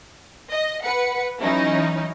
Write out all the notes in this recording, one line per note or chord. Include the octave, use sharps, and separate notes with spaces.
D#5
B4 F#5 C#7
E3 F#3 C#4 D#4 E4